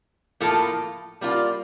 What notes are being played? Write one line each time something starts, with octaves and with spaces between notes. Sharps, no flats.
A2 F3 A#3 F4 A4
G3 A#3 F4